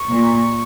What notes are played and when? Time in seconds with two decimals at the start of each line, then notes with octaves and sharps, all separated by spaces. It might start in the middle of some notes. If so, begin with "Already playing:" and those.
Already playing: C#6
0.09 A#2